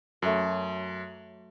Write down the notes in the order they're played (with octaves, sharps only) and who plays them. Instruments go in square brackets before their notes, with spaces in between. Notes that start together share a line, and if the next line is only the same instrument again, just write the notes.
[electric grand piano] F#2 [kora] F#3 A3